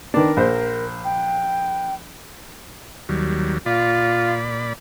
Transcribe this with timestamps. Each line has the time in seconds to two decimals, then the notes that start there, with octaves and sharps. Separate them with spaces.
0.14 D#3 B3 D4 A#4
0.37 A#1 C5
1.05 G5
3.09 D#2 F#3 G3
3.66 A#2 F4 D5 B5